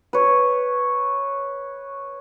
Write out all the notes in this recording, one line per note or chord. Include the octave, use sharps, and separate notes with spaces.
B4 C#5